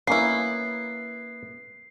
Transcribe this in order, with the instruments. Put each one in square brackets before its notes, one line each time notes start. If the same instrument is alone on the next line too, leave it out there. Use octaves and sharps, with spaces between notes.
[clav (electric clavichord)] A#3 C#4 [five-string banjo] B3 E4 [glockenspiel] C7